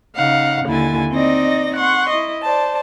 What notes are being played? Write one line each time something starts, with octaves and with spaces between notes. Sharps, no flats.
C#3 D#4 F5 F#5
D#2 D3 E4 G#5 A6
C4 D#4 D5 D#5 A#6
F#5 C6 C#6
E4 D#5
C5 D5 A5